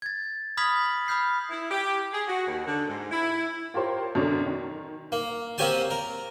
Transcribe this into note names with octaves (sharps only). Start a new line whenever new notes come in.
G#6 A6
B5 D#6 F6 G#6 B6 F#7
B5 D#6 F6 G6 C7
E4
G4
G#4
F#4
D#2
D3
G#2
E4
F4 G4 A#4 C5 C#5
F#2 B2 D3 C#5 D5
D#3
A#3
A#3 C4 C#4 G4 G#5 A5
A#4